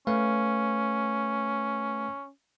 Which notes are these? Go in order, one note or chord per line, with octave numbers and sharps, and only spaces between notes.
A3 C#4 B4 F5